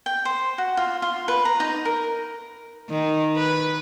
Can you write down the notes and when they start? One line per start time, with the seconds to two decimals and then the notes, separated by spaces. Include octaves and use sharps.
0.06 G5
0.25 C5
0.58 F#4
0.77 F4
1.02 F4
1.28 B4
1.45 A#5
1.60 D#4
1.85 A#4
2.89 D#3
3.36 B4